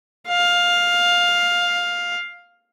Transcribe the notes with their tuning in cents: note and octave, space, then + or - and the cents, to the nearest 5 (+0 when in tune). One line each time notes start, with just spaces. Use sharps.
F5 +10